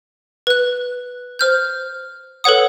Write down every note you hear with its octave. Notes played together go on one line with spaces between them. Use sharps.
B4 F#6
C5 F6 G6
A4 B4 C#5 F#5 D#6